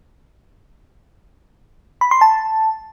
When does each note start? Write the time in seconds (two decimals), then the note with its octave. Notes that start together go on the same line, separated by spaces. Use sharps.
2.01 B5
2.11 C6
2.21 A5